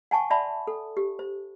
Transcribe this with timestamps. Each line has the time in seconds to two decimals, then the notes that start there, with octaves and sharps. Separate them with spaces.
0.11 F#5 G#5 A5 C#6
0.30 D5 E5 F#5 A5 B5 C6
0.67 A4
0.97 G4
1.19 C5